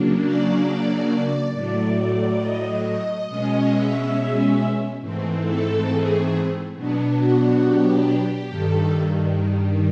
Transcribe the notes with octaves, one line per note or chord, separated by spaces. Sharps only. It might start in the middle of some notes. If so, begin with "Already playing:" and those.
Already playing: C#3 F#3 A#3 D4
D5
A2 F#3 A3 D5
D#5
D#5
B2 G#3 C#4
E5
G#2 E3 A3 C4
A4
G#4
B2 F#3 B3 D4
F#4
G4
G2 D#3 G3 A4